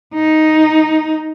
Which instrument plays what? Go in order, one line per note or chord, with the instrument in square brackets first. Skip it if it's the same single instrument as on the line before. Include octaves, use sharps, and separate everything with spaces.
[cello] D#4